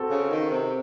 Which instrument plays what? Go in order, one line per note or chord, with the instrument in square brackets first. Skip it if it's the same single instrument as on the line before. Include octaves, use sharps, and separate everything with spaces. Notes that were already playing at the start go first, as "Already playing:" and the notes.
Already playing: [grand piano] C4 F#4 A4
[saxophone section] C#3
D#3
C3